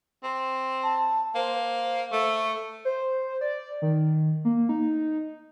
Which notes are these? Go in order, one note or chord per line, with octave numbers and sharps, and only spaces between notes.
C4
A5
A#3 C5
C5
A3
C5
D5
D#3
A#3
D#4